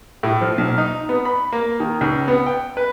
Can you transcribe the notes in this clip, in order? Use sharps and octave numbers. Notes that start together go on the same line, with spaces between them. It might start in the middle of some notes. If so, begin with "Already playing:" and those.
A2
F3
B1
D#4
B3
B5
A#3
D#3
C#2
B3
G5
B4